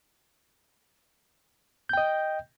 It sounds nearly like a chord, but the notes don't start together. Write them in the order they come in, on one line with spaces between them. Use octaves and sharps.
G6 G5 D#5